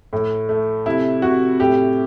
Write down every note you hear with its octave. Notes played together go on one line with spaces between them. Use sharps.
A2
A3
C3 E4
C3 F#4
A2 G4